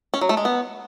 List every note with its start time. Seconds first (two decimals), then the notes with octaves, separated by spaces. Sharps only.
0.14 C#4
0.21 F#3
0.29 A3
0.37 G#3
0.45 B3